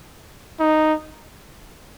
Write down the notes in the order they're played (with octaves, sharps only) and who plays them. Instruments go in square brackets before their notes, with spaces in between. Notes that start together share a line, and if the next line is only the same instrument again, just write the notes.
[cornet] D#4